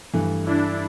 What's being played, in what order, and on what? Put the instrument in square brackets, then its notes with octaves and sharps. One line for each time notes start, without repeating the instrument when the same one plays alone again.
[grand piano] G2 E3 A3
[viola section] D4 E4